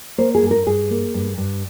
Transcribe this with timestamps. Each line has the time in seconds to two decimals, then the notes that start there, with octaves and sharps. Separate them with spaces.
0.18 A#3 C5
0.35 G#4
0.42 G2
0.51 A#4
0.66 G2 G#4
0.90 A#3
1.14 G2
1.38 G2